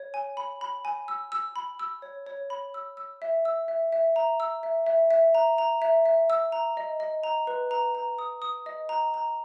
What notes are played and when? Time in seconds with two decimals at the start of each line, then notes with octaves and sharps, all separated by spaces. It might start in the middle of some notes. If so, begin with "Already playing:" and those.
Already playing: C#5
0.14 G#5
0.37 B5
0.61 B5
0.85 G#5
1.08 E6
1.32 E6
1.56 B5
1.79 E6
2.02 C#5
2.27 C#5
2.50 B5
2.74 E6
2.97 E6
3.22 E5
3.45 E6
3.68 E5
3.92 E5
4.16 A#5
4.40 E6
4.63 E5
4.86 E5
5.11 E5
5.35 A#5
5.58 A#5
5.82 E5
6.06 E5
6.30 E6
6.52 A#5
6.77 D#5
7.00 D#5
7.24 A#5
7.47 B4
7.71 A#5
7.95 A#5
8.19 D#6
8.42 D#6
8.66 D#5
8.89 A#5
9.14 A#5